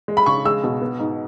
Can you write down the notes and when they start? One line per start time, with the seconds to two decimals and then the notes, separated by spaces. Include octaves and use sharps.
0.08 G#3
0.17 B5
0.26 C#3 C#6
0.45 G#3 E6
0.64 B2
0.82 B3
0.99 G#2